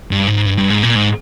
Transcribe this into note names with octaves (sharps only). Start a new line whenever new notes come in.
G2
G#2
G2
G2
G#2
A#2
G#2